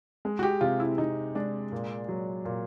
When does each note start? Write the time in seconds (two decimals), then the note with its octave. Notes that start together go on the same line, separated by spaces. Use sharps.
0.25 G#3
0.39 F#4
0.43 G4
0.61 C3 F4
0.80 E4
0.98 C3 D#4
1.35 G#3 D4
1.72 A#2
2.08 F#3
2.45 A#2